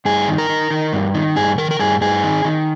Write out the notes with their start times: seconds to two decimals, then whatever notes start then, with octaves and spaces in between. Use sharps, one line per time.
0.05 G2 G#4
0.28 D#3
0.38 A#4
0.49 D#3
0.71 D#3
0.93 G2
1.14 D#3
1.36 G2 G#4
1.58 D#3 A#4
1.71 A#4
1.79 G2 G#4
2.01 G2 G#4
2.23 D#3
2.45 D#3